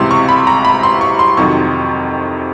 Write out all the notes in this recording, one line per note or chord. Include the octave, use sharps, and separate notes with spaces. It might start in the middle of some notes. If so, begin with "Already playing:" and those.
Already playing: C#2 C3 E3 C6
C#6
B5
A#5
B5
C6
C#6
C6
F2 C3 D#3 F#3 C#6